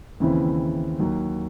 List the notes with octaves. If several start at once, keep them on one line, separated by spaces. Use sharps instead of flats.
D#2 C#3 E3 C4 E4
D#2 D#3 F#3